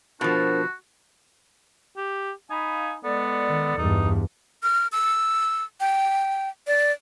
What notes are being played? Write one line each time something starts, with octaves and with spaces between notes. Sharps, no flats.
B2 F3 D4 F#4 A#4 C5
G4
D#4 F5 G#5 B5
G#3 B3 A4 D5
D#3
E2 G2 D#4
F6
E6
G5
D5